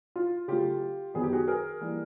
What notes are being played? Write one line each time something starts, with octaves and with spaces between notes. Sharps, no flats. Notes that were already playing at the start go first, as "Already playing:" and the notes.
F4
C#3 F#3 A3 F4 G4
F#2 D#3 F#3 B3 G#4
G4
F#4 G#4
G#4 A#4
E3 G3 A#3